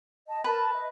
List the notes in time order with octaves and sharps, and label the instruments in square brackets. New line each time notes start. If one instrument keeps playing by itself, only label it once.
[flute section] D#5 A5
[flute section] A#4 A5 [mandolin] B4
[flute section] D#5 E5